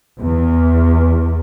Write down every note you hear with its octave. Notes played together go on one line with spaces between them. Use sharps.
E2